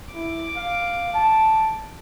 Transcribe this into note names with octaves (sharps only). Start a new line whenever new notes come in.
E4 D6
F5
A5